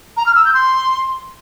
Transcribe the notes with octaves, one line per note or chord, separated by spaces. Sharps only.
A#5
F6
E6
G6
C6